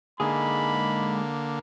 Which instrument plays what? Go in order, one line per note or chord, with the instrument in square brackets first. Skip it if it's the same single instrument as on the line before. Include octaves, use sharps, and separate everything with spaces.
[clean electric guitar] G#2 G#3 G#4 [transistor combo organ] D3 A#3 [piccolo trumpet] B5